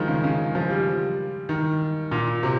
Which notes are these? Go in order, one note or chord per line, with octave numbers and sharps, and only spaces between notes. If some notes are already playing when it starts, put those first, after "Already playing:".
Already playing: D#3 F3 G#3
C#3
C#3
F3
G3
D#3
A#2
C3